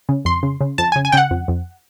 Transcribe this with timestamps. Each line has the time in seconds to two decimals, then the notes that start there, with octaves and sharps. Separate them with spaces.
0.09 C#3
0.25 F2 C6
0.43 C#3
0.61 C#3
0.78 F2 A5
0.92 C#3 G#5
1.05 G#5
1.12 C#3 F#5 G5
1.31 F2
1.48 F2